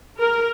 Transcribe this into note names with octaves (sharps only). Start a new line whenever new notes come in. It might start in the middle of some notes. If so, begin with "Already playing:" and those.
A#4